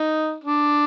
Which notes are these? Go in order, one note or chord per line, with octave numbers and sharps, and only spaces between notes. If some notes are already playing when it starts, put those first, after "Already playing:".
Already playing: D#4
D4